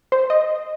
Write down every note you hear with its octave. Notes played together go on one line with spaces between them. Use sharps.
C5
D#5